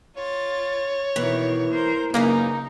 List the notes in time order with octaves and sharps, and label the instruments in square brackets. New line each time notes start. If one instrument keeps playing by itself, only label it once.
[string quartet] F4 A6 [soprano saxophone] C#5
[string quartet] B2 D#3 [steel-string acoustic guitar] E3
[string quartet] A#4 C5
[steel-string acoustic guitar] F#2 B3 F5 [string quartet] C#3 D#4 [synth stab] A#3